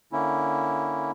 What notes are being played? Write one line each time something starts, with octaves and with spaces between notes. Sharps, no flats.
D3 A#3 C#4 E4